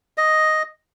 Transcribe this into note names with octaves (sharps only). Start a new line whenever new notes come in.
D#5